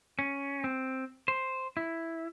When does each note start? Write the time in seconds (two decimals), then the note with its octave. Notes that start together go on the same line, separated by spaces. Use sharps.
0.19 C#4
0.64 C4
1.28 C5
1.77 E4